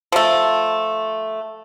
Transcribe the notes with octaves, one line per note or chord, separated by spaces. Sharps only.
F3 A3